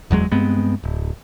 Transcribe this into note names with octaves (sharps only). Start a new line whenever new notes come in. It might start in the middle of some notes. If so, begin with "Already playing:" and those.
F#1 E2 F#3 G#3
G2 G#3 B3 C4
D1